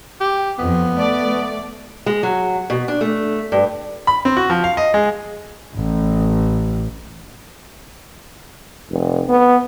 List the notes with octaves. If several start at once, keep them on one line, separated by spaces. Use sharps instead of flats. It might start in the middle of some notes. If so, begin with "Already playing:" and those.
G4
F2 B3
A3 D5
G#3
F#3
B2
D4
A3
G2
B5
C4
F#4
F3
F5
D#5
G#3
A1
F1
B3